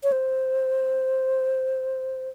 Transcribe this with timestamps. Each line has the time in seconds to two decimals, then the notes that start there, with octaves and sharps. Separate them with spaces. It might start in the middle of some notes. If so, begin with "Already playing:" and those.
0.03 C#5
0.12 C5